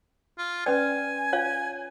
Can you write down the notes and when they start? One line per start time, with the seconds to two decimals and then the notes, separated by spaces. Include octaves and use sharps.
0.38 F4
0.66 C#4 B4 D5 G#5
1.33 F4 C#5 F5